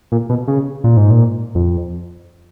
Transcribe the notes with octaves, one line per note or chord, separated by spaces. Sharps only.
A#2
B2
C#3
A#2
G#2
A#2
F2